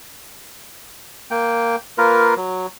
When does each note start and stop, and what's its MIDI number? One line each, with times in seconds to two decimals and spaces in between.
1.31 1.76 58
1.31 1.76 79
1.98 2.34 58
1.98 2.34 65
1.98 2.34 70
1.98 2.34 71
2.37 2.67 54